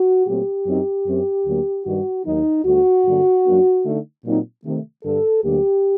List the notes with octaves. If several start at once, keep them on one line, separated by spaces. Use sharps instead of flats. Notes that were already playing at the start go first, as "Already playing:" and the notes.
Already playing: F#4
A#2 F#3 A3 C4 G4
F#2 F#3 C4 D#4
F#2 F#3 C4
D2 D3 F#3 A#3
G2 D#3 G3 F#4
D#2 D#3 F#3 D#4
D2 D3 G3 F#4
G2 D3 F#3 A#3 D4
F#2 F#3 A#3 D4
D3 A3 D#4
A#2 F#3 C4 D#4
C3 D#3 A3
G2 D3 G3 A4
D2 D3 F#3 A#3 G4